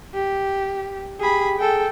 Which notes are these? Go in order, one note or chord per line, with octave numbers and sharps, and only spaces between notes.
G4
G4 G#4 B5
G#4 A4 G5